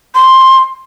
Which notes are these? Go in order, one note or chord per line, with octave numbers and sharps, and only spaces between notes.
C6